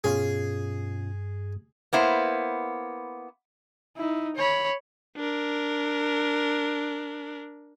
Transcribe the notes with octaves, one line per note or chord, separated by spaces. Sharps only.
G2 B2 C#4 F4 G#4
A#3 B3 E4 C5
D#4 E4
C#5 B5
D4 A#4